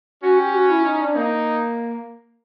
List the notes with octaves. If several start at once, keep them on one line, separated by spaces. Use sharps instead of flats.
C#4 F#4
G4
F#4
E4
D#4
D4
A#3 D#4